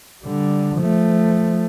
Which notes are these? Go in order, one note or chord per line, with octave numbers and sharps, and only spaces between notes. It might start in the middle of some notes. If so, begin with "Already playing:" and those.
D3 G3
F3 A3